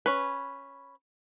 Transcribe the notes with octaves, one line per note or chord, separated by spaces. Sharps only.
C#4 B4